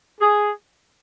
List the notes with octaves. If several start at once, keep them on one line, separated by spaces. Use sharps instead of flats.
G#4